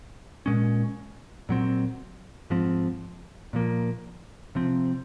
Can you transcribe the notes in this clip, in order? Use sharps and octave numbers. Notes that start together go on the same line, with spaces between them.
A#2 G#3 C#4
A#2 F#3 C4
G#2 F3 C4
A#2 F3 A#3
C3 F3 C4